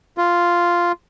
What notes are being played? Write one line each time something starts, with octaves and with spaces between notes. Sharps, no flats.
F4